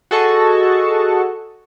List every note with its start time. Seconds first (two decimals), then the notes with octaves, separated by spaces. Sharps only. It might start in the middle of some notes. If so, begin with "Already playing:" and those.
0.11 F#4 G#4 A4 D#5 A5 C#6